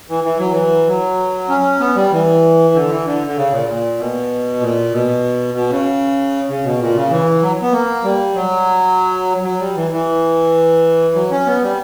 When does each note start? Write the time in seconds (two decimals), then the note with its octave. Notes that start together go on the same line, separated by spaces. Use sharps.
0.09 E3
0.24 E3
0.39 F#3
0.52 E3
0.88 F#3
1.49 C#4
1.80 B3
1.96 G3
2.12 E3
2.75 D3
2.89 E3
3.05 D3
3.27 D3
3.37 C#3
3.51 A#2
3.68 A#2
3.98 B2
4.60 A#2
4.93 B2
5.54 B2
5.70 C#3
6.49 C#3
6.64 B2
6.80 A#2
6.95 C#3
7.11 E3
7.42 F#3
7.62 B3
7.73 A#3
8.04 G3
8.35 F#3
9.44 F#3
9.60 G3
9.76 E3
9.91 E3
11.15 F#3
11.31 C#4
11.47 B3
11.62 G3